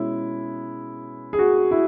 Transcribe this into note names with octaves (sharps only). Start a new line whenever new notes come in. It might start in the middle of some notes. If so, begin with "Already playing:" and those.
Already playing: B2 G#3 C#4 E4
G#4
F#4
E4